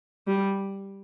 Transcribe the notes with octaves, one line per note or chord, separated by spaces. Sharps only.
G3